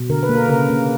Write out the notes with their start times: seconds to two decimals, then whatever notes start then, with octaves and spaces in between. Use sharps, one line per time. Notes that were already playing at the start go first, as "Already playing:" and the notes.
Already playing: B2
0.10 D3 A#4
0.23 B4
0.29 A#3
0.36 A#4
0.49 C#3 A#4
0.69 A#3